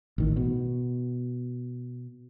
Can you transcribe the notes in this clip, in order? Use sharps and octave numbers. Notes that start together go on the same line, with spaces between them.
A1 D#3
B2